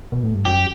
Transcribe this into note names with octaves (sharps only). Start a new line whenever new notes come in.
B2
A2
G2
F#2 G4